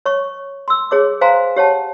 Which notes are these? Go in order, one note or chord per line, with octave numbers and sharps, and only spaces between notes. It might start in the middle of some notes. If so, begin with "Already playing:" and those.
C#5 C#6
C6 E6
G#4 C#5 D6
C5 F5 G#5 A#5 C6
G4 C#5 F#5 A5